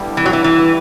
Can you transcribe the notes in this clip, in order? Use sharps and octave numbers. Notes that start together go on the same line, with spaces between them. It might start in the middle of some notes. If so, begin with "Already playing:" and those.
Already playing: G2 D3 G3 B3 E4
E3
F#3
E3
E3